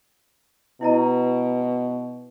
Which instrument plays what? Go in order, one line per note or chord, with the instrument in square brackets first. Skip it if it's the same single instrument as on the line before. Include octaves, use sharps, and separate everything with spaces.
[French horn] B2 [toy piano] E4 D#5 A#5